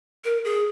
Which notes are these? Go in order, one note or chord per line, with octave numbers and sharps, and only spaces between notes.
A#4
G#4